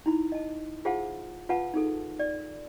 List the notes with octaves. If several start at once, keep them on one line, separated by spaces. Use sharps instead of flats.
D#4 E4 B5
D#5 A5
F4 G#4 C5 F5 F#5 A5
F4 B4 F5 F#5 A5
D#4 G#4 A4
D5